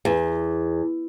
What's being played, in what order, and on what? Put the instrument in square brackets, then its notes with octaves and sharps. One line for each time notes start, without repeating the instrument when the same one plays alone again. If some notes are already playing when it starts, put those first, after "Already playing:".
[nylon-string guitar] E2